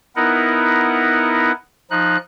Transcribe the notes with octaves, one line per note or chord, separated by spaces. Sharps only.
B3 D#4 E4 A#4 F#5
F3 D#4 F#6